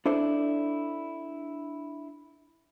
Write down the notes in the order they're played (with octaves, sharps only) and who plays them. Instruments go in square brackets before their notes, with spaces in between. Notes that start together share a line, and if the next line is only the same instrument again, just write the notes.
[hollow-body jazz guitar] D4 E4 A4 C5 D5